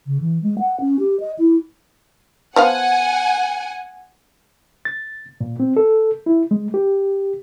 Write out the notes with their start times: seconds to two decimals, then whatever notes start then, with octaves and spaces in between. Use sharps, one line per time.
0.07 C#3
0.21 E3
0.43 G#3
0.59 F#5
0.80 C#4
0.99 G4
1.20 D#5
1.39 E4
2.56 F3 B3 F5 F#5 G#5
4.85 A6
5.41 A#2
5.60 C4
5.77 A4
6.26 E4
6.51 G#3
6.74 G4